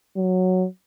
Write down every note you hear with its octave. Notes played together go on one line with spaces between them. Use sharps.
F#3